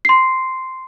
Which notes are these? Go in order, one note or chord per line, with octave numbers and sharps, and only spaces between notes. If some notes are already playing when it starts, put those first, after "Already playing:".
C6 C7